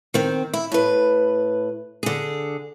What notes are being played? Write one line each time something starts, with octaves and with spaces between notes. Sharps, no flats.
D#3 C4
E4
A2 B4
D3 G#4